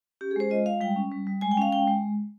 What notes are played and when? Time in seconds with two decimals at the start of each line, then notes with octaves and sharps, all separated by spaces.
0.21 C#4 G4
0.31 G#4
0.36 G#3 C5
0.50 F4 D#5
0.66 G#3 F5
0.81 G3 G5
0.96 C#4
1.12 G3
1.27 G3
1.41 G#3 G#5
1.51 G5
1.57 C#4 F5
1.72 G#3 G5
1.87 G#3